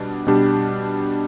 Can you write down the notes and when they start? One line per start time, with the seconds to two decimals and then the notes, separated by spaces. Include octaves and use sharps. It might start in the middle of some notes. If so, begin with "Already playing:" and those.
Already playing: B2 G3 D4
0.27 B2 G3 D4 G4